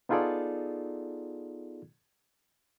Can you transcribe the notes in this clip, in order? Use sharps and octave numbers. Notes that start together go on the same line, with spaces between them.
B3 D#4 F4 G#4 A4 D5